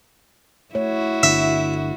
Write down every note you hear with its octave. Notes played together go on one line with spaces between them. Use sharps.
A3 E4 F#4 C#5
G1 D3 E5